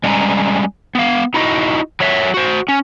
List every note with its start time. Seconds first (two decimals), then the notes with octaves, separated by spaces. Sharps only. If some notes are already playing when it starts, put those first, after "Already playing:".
0.04 G3 G#3 C#4 F#5 G#5 A#5
0.95 B3 F5
1.34 D#4 E4 F#4 D#5
2.00 F#3 C#5 E5
2.34 F#4 C5
2.68 C#4